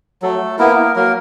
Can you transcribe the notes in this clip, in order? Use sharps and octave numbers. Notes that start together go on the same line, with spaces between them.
F#3 A3 A4
A#3 B3 E4 A#4
F#3 A#3 A#4